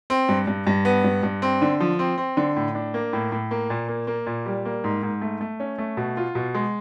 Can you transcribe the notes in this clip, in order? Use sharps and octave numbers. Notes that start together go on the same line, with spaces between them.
C4
G2
G2
G2
B3
G2
G2
C4
D3
F3
C4
C4
D3
A2
D4
A#3
A2
A2
A#3
A#2
A#3
A#3
A#2
G3
A#3
G#2
G#2
A3
A3
C#4
A3
B2
F4
B2
G#3